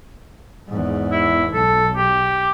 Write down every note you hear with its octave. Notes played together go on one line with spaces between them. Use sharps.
E2 G#2
E4
B1 A4
G4